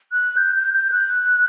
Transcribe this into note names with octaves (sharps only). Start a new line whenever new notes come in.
F#6
G6
G6
G6
F#6